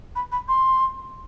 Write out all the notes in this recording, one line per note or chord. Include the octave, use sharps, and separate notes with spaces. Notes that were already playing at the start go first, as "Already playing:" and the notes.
B5
B5
C6